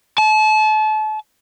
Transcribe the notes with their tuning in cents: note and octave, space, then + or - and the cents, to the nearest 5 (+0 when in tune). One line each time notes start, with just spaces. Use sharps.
A5 -35